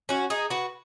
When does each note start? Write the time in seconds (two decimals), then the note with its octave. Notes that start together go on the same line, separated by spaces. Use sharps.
0.09 C#4 F#4
0.30 D#4 G#4
0.50 F#4 B4